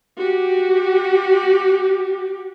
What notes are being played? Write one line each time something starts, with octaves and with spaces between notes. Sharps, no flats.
F#4 G4